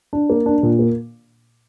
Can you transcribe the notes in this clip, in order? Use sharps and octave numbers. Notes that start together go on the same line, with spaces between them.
D4
A#3
D4
A#2
A#3